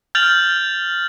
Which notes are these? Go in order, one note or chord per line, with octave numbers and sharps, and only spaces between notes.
F6 G6 A6 F7 F#7